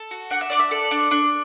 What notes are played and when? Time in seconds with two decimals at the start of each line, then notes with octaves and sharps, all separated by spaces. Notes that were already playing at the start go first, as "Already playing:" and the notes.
Already playing: A4
0.11 F#4
0.30 D4 F#5
0.41 E5
0.50 D4 D5
0.59 E5
0.71 A4 D5
0.91 D4
1.11 D4